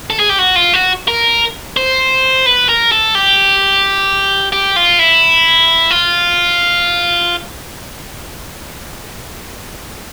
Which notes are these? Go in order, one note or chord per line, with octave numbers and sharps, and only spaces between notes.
A4
G#4
G4
F#4
F4
F#4
A#4
C5
B4
A#4
A4
G4
G4
F4
E4
F4